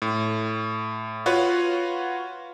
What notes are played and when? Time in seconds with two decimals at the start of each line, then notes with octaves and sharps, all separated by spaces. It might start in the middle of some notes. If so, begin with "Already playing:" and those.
0.02 A2
1.26 F4 F#4 B4 C#5